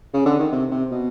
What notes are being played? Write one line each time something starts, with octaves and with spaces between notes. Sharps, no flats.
C#3
D3
D#3
C3
C3
B2